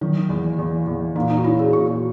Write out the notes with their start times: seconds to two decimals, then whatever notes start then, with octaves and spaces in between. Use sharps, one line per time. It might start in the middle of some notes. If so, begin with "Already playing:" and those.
0.01 D#3 F#3
0.29 E2
0.59 E2
0.87 E2
1.16 A#2 D#4
1.30 D#4
1.37 F#4
1.44 C#4 E4
1.59 G#4
1.73 A#2 F#4